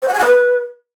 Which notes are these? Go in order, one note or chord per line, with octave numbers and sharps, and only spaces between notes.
C5
F#5
G#5
F#5
B4